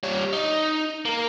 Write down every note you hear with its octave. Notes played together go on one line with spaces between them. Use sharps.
G3 C#5
D#4
A#3 A#4